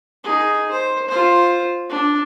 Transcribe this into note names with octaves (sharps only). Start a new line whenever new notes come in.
D#4 G#4
C5
F4 C5
D4